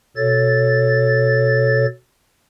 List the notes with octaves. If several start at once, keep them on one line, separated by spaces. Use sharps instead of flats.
B2 A4 C#5 A6